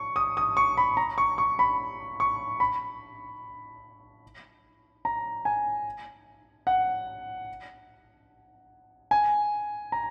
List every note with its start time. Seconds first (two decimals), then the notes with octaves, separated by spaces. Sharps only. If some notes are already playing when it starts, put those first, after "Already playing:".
Already playing: C#6
0.16 D#6
0.37 D#6
0.57 C#6
0.77 B5
0.97 A#5
1.18 C#6
1.38 C#6
1.59 B5
2.20 C#6
2.60 B5
5.05 A#5
5.45 G#5
6.67 F#5
9.11 G#5
9.92 A#5